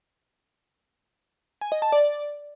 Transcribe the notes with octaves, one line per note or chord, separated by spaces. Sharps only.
G#5
D#5
A5
D5